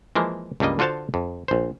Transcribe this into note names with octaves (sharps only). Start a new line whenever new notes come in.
E3 F3 G#3 A#3
C#2 G2 G3 A#3 D#5
D3 F4 F#4 C5 F5 A5
F2
A#1 C5